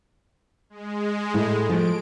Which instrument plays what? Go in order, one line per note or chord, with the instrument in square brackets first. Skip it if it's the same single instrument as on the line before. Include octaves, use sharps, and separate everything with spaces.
[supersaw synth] G#3
[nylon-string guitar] A2 E4
[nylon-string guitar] F3 A3 [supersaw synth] D7